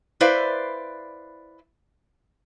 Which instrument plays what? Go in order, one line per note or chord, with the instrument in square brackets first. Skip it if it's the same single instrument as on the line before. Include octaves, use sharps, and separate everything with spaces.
[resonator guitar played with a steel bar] E4 B4 C5 D5 E5 F5